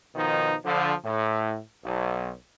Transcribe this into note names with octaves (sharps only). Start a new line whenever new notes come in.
B2 D#3 F3 D#4
D3 F3
A2
B1